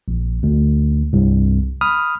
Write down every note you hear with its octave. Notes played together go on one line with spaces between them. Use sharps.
A#1
D2
C2 G2
B5 D#6 F6